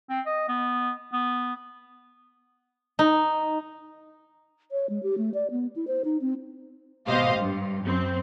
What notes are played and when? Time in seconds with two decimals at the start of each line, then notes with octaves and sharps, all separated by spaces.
0.10 C4
0.26 D#5
0.48 B3
1.13 B3
2.99 D#4
4.72 C#5
4.90 G#3
5.03 G4
5.18 A3
5.34 D5
5.51 B3
5.76 E4
5.87 C5
6.05 D#4
6.21 C4
7.06 G#1 B2 G4 C5 D#5 F5
7.37 G2
7.85 F#2 C4